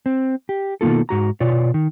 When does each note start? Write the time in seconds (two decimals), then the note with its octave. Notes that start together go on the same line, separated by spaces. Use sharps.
0.06 C4
0.49 G4
0.81 B2 D#3 G#3 A#3 F4 A4
1.09 G#2 F#4 A#5
1.40 B2 F4 C#5 D5
1.74 D#3